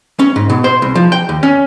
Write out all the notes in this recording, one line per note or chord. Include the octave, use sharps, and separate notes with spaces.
C#4
G#2
B2
C5
C2
F3
G5
D#2
C#4